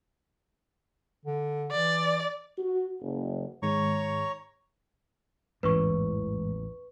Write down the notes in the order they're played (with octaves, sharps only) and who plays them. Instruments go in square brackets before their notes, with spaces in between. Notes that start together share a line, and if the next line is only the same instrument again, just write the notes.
[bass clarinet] D3
[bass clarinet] E3 [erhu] D5
[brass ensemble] F#4
F#1
[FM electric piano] G#2 D#3 G#3 [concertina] C#5 A#5 C#6
[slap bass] A1 E2 [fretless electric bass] G#2 E3 C#4 [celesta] B4 C#6